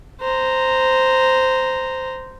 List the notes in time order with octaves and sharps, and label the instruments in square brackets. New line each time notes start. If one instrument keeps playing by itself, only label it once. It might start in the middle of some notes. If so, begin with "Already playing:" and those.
[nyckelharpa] C5 A#5